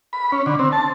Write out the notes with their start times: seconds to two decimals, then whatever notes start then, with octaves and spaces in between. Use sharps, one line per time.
0.13 B5
0.32 C#4
0.46 D3
0.59 C4
0.72 A5